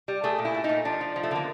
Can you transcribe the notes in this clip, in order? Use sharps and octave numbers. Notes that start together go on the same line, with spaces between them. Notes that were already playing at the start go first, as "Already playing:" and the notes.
G3
A3 G#4
A#2
E4
A3
D#4
A#2
F3 D4
F3
F3
A3
D3 A#3